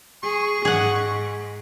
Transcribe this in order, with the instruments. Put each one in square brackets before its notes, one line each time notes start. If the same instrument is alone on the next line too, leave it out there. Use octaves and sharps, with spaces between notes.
[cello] G#4 [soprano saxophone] C#6
[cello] G#2 [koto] G#4 F#5